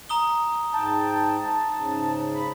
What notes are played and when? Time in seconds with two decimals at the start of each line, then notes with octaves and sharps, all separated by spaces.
0.09 A#5 D#6 G7
0.73 G#2 G5 A5
1.76 G#2 C#3
2.34 B5